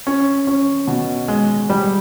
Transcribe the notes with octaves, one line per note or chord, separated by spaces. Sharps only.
C#4
C#4
B2
G#3
G3